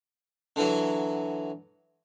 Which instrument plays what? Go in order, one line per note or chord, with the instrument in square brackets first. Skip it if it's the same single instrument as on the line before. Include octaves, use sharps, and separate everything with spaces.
[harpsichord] D3 E3 F#3